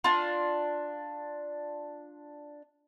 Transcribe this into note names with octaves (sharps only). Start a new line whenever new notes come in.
D4 F4